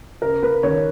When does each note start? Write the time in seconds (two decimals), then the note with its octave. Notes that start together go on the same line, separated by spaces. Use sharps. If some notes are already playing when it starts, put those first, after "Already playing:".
0.21 C#3 A#4
0.42 A#3 B4
0.63 D#2 C#5